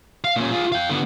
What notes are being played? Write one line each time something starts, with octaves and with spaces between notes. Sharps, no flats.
F5
A#2 C#4
F4 G#4
F5 G5
D3 B3